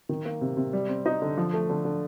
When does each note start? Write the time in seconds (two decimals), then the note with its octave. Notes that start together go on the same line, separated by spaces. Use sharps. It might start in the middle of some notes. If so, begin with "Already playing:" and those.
0.09 D#3
0.25 A#3
0.41 C3
0.57 C3
0.73 G3
0.88 C4
1.06 D#4
1.22 D3
1.37 F3
1.54 A3
1.70 D3
1.85 D3